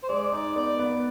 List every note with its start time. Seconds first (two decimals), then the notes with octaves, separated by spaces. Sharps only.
0.04 C5
0.09 G#3 D5
0.32 D#4
0.56 B3 D5
0.79 B3